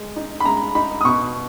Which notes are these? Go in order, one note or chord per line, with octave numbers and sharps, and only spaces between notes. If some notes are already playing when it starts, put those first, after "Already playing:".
Already playing: G#3
D#4
B5
G#3 A#5
D#4 B5
D#6
B2 C#6